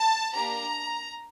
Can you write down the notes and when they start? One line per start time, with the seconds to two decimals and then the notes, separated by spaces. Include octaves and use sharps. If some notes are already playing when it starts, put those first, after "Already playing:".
Already playing: A5
0.34 A#3 D4 G4 A#5